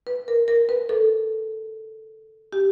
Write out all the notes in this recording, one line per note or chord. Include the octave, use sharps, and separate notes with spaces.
B4
A#4
A#4
B4
A4
G4